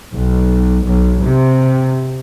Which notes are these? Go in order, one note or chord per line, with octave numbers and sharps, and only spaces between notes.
B1
B1
C3